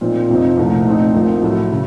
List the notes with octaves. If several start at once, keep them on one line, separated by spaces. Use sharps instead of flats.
A#2 F3 C4 D#4
F2 C3 F3 C4 D#4
C2 A#2 A3
A#2 A3 C4 D#4
C2 C3 F3 A#3
A2 F#3 A3
C#3